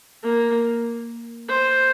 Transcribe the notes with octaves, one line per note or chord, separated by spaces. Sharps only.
A#3
C5